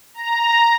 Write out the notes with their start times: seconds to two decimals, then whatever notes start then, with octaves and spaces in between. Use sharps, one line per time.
0.14 A#5